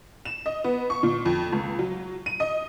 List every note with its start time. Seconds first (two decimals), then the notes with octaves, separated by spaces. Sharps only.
0.25 E7
0.46 D#5
0.64 B3
0.90 C#6
1.03 A#2
1.26 F2
1.52 C#2
1.79 F#3
2.26 D#7
2.40 D#5